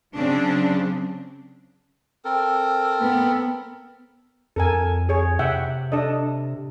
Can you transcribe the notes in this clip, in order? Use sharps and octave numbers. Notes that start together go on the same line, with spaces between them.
C#3 F#3 C4 D4
C4 A4 A#4
B3
F2 A4 A#4 G#5
G#4 C#5
C3 E5 F#5 G5
D4 A4 D#5